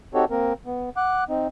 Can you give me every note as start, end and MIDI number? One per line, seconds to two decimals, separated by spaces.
0.14 0.25 60
0.14 0.25 63
0.14 0.25 66
0.14 0.25 67
0.14 0.25 69
0.14 0.25 73
0.30 0.53 58
0.30 0.53 60
0.30 0.53 70
0.66 0.90 59
0.97 1.24 78
0.97 1.24 86
0.97 1.24 90
1.29 1.48 60
1.29 1.48 63